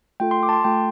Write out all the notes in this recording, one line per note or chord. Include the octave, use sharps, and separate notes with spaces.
A3 F4 A4 G5
C6
D6
A5
C6
A3 F4 A4 G5